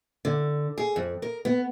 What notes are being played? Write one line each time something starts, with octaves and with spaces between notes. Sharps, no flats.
D3
G#4
F2
A#4
B3